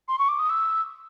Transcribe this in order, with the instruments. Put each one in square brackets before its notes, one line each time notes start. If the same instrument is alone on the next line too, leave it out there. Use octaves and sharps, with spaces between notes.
[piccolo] C6
C#6
D6
D#6
E6